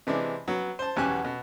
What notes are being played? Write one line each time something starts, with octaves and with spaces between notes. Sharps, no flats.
C3 E3 G#3 D4
F#3 B3
C5 A5
B1 E2 C#4 G4 G#5 F#6
B2